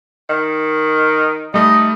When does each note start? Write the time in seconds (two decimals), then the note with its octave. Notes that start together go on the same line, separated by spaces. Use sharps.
0.29 D#3
1.54 G3 A3 D#4 D#5